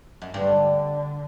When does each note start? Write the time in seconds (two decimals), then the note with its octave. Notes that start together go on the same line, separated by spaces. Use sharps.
0.22 F#2
0.34 G2 D3